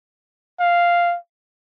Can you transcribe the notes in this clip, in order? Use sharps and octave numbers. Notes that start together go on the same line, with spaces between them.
F5